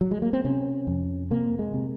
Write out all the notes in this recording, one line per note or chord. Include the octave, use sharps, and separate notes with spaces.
F#3
G#3
A#3
C4
C3 C#4
F2
C3 A#3
G#3
C3